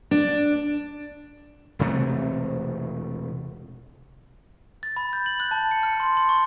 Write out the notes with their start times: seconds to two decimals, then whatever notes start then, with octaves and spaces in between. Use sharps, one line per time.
0.11 D4
1.79 E1 C3 A3
4.83 A6
4.96 B5
5.13 G6
5.26 F#7
5.40 F#6
5.51 A5
5.71 C#7
5.83 F6
6.00 C6
6.17 C6
6.29 C#6